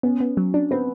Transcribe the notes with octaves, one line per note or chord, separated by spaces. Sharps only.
B3 C#4
B3
F#3
D4
B3 C4